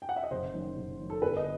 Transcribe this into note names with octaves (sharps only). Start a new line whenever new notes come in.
G5
F#5
E5
D#5
F#1 C5
F#2 D#3
F#1
F#2 D#3
A4
G1 B4
D#5